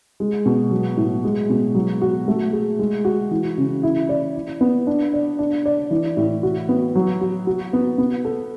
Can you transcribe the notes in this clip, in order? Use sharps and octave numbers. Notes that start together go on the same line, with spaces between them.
G#3
B2
F#3
A2
G#3
B2
F#3
F#4
A3
G#4
G#3
F#4
E3
C#3
E4
D5
E4
B3
D4
D5
D4
D5
E3
A2
F#4
B3
F#3
F#4
F#4
B3
B3
A4